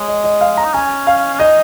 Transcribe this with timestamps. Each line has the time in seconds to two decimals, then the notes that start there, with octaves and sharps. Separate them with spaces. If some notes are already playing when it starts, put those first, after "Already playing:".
Already playing: G#3 C#5
0.08 D#5
0.24 D#5
0.41 F5
0.57 A#5
0.65 D#4
0.74 C#4 G#5
1.07 F5
1.34 C#4
1.40 D#4 D#5